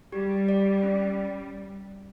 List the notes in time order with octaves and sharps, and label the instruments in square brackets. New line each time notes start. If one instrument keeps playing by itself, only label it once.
[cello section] G3 [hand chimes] G4
[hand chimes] D5
C#4